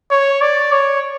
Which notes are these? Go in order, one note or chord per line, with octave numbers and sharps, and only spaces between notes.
C#5
D5
C#5